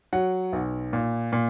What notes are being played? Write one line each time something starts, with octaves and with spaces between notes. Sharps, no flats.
F#3 F#5
B1
A#2
A#2